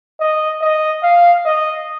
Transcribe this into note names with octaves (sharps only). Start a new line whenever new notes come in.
D#5
D#5
F5
D#5